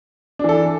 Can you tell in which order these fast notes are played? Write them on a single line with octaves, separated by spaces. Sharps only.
D4 E3 A4